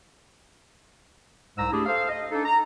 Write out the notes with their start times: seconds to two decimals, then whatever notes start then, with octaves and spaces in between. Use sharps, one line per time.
1.58 C2 G#2 G#3 A#5 E6
1.71 A3 D4 E4 G4 G#4
1.86 A4 C5 F5
2.09 D#5
2.32 D4 D#4 A4
2.45 A#5